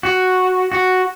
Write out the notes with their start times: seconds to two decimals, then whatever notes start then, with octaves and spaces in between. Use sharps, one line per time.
0.03 F#4
0.72 F#4